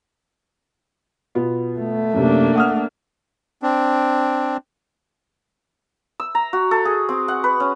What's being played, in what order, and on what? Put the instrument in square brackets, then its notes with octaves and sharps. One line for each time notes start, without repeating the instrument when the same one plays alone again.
[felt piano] B2 B3 F4
[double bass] A3
[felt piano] F#2 C3 [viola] A#3 D4
[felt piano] F#5 D#6 F6
[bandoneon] C4 D4
[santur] E6
A#5
F#4
A4
G#4
C4
F#5
B4
C#4